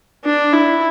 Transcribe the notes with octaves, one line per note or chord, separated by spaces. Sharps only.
D4
E4